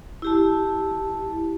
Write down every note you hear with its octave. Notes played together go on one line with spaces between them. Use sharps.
E4 G4 A5